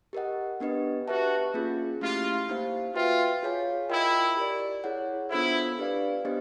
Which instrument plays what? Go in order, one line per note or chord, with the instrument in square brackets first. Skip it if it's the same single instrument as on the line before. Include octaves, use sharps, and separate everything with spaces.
[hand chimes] G4 A#4 D#5 F#5
B3 D4 G4 B4 D#5
[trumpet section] F#4 [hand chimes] G4 B4 E5 A5
[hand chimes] A#3 C#4 F4 G#4
[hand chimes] A3 C#4 E4 G4 [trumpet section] F4
[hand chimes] A#3 D#4 G4 C5 F5
[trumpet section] F4 [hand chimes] F#4 B4 E5 G5
[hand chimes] F4 G#4 C#5 F5 G#5
[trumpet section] E4 [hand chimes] F4 A#4 D#5 G5
[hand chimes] G4 A#4 D5
E4 G#4 C#5 F#5
[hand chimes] B3 D4 F4 A4 C5 [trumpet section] E4
[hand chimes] D4 G4 B4 D5 F5
B3 D4 G4 C5 D#5